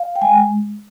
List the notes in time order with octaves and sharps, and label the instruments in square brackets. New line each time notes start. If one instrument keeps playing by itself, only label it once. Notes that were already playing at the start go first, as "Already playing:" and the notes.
Already playing: [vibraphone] F5
G5
G#3 G#5